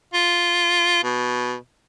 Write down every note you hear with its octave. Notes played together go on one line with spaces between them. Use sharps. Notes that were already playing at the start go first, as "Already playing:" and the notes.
F4
B2